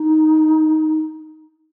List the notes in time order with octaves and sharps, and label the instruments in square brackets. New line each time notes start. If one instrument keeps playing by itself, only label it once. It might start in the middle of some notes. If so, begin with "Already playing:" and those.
Already playing: [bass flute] D#4